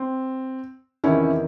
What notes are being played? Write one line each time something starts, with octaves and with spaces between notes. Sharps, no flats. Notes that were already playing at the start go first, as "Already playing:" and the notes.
Already playing: C4
E2 C3 D#3 C#4 E4